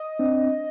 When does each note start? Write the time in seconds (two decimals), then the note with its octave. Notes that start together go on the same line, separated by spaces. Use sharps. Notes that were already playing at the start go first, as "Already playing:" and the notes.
Already playing: D#5
0.19 C4 D4